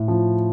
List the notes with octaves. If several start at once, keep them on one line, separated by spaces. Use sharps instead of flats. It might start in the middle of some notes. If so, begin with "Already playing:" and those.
Already playing: A2
F3